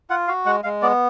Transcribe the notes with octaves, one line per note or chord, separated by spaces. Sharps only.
F4 F#5
F#4 F5
G#3 F#5
G#3 F5
B3 D5